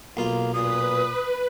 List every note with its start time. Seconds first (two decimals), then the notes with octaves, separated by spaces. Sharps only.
0.17 B1 A#3 F4
0.54 A#2 B4 D#6